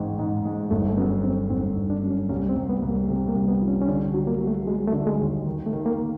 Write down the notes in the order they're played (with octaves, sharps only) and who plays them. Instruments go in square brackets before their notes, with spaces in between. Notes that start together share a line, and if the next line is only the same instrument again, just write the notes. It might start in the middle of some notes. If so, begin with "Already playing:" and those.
Already playing: [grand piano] A1 G#2 D#3 G#3
G#2
G#3
[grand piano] G1 [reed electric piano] A3
[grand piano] F#2 [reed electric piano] B3
[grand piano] F#2 [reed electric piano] C4
[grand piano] G1 [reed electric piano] C4
[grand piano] G1
[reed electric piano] D4
[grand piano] F#2
[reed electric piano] C#4
[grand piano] C2 [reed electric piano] C#4
[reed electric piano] C4
[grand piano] C2
[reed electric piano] B3
[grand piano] C2
[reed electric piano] A#3
[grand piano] C3 [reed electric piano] A3
[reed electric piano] A#3
[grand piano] C2
[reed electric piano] B3
[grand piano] F3
[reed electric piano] C#4
C#4
[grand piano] D3 [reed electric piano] D4
[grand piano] F#3
[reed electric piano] A#3
[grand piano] F#3
[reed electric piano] A3
[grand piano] F#3 [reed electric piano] G#3
[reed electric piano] A3
[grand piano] D3
[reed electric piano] G#3
[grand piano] D#2
D#3
[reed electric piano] A3
[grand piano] D#3
[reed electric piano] A#3